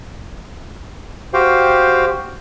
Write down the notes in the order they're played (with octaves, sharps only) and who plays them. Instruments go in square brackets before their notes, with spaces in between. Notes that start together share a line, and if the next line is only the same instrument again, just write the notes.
[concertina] F#4 G4 C5 F5 G5